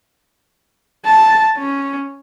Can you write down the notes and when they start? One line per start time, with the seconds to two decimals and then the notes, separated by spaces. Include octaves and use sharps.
1.06 A5
1.58 C#4